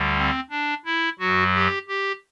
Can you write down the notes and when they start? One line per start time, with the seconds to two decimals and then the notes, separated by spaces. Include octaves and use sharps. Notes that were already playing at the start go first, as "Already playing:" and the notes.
Already playing: D2 D3 G3
0.16 C4
0.50 D4
0.85 E4
1.19 F#2 F#3 F#4
1.55 G4
1.88 G4